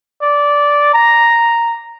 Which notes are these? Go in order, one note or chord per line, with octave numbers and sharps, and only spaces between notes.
D5
A#5